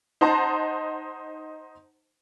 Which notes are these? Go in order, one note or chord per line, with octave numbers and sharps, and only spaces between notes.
D#4 C5 F#5 A5 A#5 C6